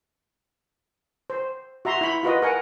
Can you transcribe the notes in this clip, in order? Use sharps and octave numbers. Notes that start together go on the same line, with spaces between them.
C5
F#4 E5 A#5 C6
E4 B5
F4 F#4 B4 D#5
A#4 F#5 G#5